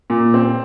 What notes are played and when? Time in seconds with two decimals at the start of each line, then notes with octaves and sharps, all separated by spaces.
0.10 A#2
0.34 C4